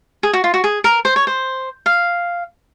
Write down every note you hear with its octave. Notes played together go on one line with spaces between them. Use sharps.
G#4
F#4
F4
F#4
G#4
A#4
C5
C#5
C5
F5